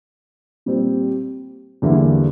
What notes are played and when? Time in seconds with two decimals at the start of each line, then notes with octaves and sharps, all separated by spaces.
0.66 A#2 G3 C4
1.82 E2 D3 G3 A#3 E4